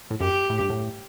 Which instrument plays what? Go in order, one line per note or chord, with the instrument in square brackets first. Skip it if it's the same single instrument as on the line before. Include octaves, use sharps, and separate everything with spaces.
[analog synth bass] A2
[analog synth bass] F#2 [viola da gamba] G4
[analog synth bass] A2
G2
A2